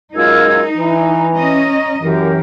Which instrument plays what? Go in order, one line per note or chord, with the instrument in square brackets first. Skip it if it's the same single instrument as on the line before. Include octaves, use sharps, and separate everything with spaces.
[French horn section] F#2 G#3 A#4 [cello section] D#4 [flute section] F4 E6 G#6
[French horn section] E3 [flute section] A#5
[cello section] C#4 D#5
[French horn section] F#2 [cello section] E3 [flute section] G4 A#4